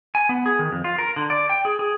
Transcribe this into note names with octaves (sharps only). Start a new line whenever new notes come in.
G#5
B3
G#4
D#3
F2
F4
A#4
D3
D5
G5
G#4
G#4